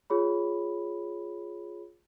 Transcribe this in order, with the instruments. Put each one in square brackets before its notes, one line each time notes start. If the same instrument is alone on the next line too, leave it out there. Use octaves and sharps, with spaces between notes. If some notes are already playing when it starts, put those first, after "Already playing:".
[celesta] F4 G#4 C#5 B5